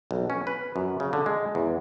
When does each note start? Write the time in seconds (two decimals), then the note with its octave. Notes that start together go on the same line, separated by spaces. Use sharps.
0.11 B1
0.30 C#4
0.47 B4
0.76 F#2
1.00 C#3
1.13 D3
1.26 G#3
1.55 E2